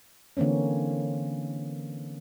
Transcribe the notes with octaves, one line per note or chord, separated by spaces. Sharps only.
D3 E3 A#3 C4 C#4